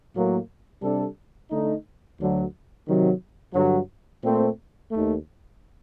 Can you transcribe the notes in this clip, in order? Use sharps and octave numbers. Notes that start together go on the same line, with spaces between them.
A2 F#3 A#3
C3 G3 D4 A4
D3 A3 D#4
D2 D3 F#3
C3 D#3 F#3
G2 D3 F#3
A#2 A3 C4
D#2 D#3 A3